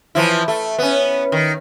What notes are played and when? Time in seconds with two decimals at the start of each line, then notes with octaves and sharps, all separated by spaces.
0.15 E3 F3 E4
0.48 A3
0.78 B3 C#4
1.32 D#3